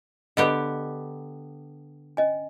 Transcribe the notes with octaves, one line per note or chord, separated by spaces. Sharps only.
D3 B3 G4 D#5
C#4 D#5 G#5